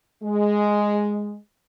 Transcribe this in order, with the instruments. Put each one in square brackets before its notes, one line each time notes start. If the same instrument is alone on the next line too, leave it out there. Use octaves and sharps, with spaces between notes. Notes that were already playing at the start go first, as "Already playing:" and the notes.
[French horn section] G#3